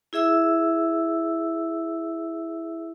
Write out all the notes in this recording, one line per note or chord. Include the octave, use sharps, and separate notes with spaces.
E4 G#4 E5 E6